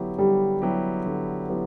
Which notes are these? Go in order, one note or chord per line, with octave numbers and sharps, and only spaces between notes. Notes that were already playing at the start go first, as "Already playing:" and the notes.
Already playing: D3 F#3 B3 E4 G4
D3 G3
F#3 B3 E4 G4
D3
F#3 B3 E4 G4